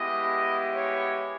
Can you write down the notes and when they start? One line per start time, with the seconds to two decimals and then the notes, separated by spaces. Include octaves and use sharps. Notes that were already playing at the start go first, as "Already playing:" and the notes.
Already playing: G#3 B3 E4 G4 D#5
0.74 C#5